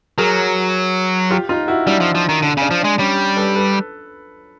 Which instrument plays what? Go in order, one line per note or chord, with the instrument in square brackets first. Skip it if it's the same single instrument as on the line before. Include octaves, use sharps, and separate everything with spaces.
[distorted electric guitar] F#3 [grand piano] G#4 A#4
[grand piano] F4 G4
D#4 F4
E4 F#4
[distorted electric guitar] G3 [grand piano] D4 E4
[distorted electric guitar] F3
F3
D#3
[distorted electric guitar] D3 [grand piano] D4
[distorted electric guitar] C#3 [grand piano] D4
[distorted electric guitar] F3
[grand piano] D4
[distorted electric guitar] G#3
[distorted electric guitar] G3 [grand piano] C#4
[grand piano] A4 B4
A4 B4